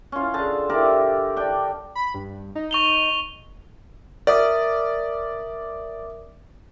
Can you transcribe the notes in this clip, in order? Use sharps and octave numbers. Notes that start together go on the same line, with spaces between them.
C#4 F4
D3 G#4 A5
G4 A#4 D5 E5
D4 G5
B5
G2
D#4
C#6 F7 G7
A#4 D5 E5 D#6